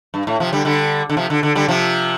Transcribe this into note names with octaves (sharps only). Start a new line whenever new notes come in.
G2
A2
C3 F3
D3 G3
D3 G3
D3
C3 F3
D3
D3
D3 G3
C3 F3